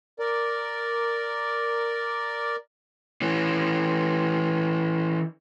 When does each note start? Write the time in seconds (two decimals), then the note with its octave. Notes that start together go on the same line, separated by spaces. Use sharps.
0.19 A#4 D5
3.22 E3 C#4